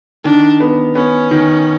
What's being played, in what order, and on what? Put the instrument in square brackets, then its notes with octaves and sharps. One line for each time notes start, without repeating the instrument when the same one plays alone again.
[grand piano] D#3 [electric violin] D4
[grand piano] B3
[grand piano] B3 [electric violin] C#4
[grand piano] D#3